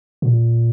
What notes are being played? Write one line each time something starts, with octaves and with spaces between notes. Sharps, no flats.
A#2